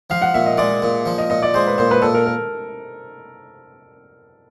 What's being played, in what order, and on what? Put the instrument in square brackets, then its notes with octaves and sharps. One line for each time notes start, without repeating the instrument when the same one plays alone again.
[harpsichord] F3 [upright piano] F5
[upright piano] F#5
[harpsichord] A#2 [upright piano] E5
[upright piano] D#5
[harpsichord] G#3 [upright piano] D5
[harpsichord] A#2
F3
[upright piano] D#5
[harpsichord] A#2 [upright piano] D#5
[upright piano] D5
[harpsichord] G#3 [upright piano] C5
[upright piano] B4
[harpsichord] A#2 [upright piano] C5
[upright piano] B4
[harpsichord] A#2 [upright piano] A4
[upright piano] A#4
A#4